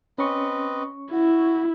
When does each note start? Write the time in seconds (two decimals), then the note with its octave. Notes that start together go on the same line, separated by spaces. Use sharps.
0.18 C4 C#4 B4 D#5 C#6
1.12 E4 F#4